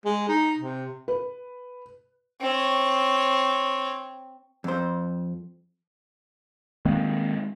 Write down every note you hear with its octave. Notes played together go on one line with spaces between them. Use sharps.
G#3
D#4
C3
B4
C4 C#5
F2 C5
D#3 G#3 A#3 C4